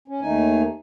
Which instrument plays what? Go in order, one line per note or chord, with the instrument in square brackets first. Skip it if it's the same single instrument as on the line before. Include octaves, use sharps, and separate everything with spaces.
[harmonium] C#4
D#2 D#3 A3 D#4 G#5